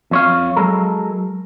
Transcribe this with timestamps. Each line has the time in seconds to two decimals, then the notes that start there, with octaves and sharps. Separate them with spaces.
0.11 F2 C#5 F5
0.56 F#3 G#3 A4 A#4